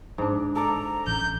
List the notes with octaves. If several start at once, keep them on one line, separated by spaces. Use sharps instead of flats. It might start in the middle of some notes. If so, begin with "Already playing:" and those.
G#2 D4
A4 D5 A#5
A1 G6